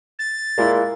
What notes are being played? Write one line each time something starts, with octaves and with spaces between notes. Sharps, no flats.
A6
A#2 G#3 E4